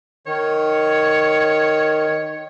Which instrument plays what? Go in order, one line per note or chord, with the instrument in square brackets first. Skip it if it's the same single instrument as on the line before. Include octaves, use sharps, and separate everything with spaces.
[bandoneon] D#3 [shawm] C#5